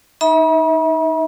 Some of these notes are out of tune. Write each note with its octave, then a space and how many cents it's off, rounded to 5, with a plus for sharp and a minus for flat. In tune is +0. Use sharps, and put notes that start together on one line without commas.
D#4 +0 E5 -35 B5 -45